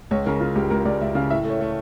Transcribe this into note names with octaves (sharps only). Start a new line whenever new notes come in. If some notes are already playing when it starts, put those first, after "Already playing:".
C#2 C#5
C#3 A#4
C#3 F4
C#2 G4
C#2 A#4
C#2 D5
C#2 E5
C#3 F5
A2 E5
A3 C#5
A3